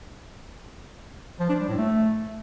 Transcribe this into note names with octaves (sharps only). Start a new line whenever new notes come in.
F3
D4
G3
A2
A3